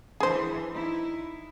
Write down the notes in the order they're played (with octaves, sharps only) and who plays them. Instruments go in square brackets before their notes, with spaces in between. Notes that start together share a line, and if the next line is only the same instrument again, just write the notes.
[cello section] E3 D4 [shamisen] G#4 C5
[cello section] D#4 E4